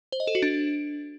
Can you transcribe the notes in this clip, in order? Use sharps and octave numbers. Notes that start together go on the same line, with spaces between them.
C5
D#5
A4
F#4
D4